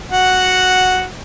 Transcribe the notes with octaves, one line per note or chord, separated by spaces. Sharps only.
F#4 F#5